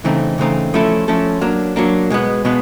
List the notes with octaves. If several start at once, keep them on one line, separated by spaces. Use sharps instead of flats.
C#3 E3 A3 C4 D#4
C#3 E3 A3 C4 D#4
F3 A3 C#4 E4 A4
F3 A3 C#4 E4 A4
F#3 A#3 D4
F#3 A#3 D4
B2 G#3 B3
B2 G#3 B3